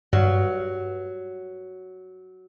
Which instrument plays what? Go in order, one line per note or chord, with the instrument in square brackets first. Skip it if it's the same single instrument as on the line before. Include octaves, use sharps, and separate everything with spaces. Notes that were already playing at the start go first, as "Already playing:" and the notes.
[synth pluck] G2 [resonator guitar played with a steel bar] F#3